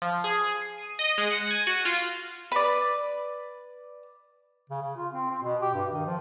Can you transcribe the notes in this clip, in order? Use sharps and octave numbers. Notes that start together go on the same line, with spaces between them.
F3
G#4
C7
D#7
D#5
G#3
F#5
G#5
F#4
F4
B4 D5
C#3
C#3
F4
C4
C4
B2
G4
G2
D#3
F3